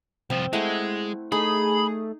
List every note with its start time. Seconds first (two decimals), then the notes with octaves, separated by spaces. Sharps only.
0.30 C2 F3 C4
0.53 G#3 A3 E4 F#5
1.32 A3 D#4 G#4 B5